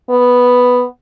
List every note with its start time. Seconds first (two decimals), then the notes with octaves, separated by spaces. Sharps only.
0.10 B3